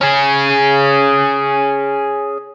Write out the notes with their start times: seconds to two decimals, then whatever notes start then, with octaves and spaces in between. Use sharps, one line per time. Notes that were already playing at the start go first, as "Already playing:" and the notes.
0.01 C#4 G#4